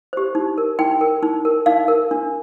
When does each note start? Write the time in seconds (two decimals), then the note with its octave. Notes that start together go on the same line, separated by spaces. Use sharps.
0.13 G4 C5
0.35 D#4
0.58 A#4
0.79 D#4 G5
1.01 A#4
1.23 D#4
1.45 A#4
1.66 D#4 F5
1.88 A#4
2.11 D4